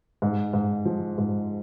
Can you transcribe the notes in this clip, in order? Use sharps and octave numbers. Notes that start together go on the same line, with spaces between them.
G#2
G#2
F3
G#2